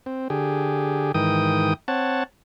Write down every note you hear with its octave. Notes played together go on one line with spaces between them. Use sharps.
C4
D3 G4 G#4
G#2 D#3 E3 G5 D#6
C4 C#5 F#5 A5